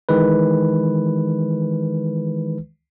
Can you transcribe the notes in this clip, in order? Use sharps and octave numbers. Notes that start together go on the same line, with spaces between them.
D#3 E3 G#3 B4